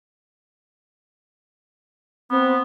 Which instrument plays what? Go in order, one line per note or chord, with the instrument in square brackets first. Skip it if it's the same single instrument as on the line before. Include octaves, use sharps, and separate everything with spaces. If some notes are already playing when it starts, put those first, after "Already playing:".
[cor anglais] B3 [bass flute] C4